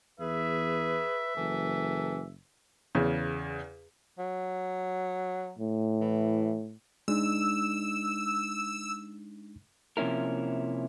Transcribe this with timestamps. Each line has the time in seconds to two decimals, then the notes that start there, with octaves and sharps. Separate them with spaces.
0.20 E2 G#4 B4 E5
1.37 F#1 E3 A4
2.95 E2 C#3
4.19 F#3
5.58 A2
6.01 E3
7.08 G#3 D4 D#4 E6
9.97 C3 F3 A#3 C#4 E4 A#4